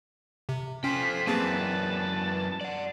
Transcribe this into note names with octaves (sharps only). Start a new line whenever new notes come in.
C3
C#4 F4 A4 C5 G5 B6
F#2 E3 A#3 C4 G#4 B4 A5
D5 F#5